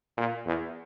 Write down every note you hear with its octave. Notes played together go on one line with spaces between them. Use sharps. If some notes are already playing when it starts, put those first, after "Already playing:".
A#2
E2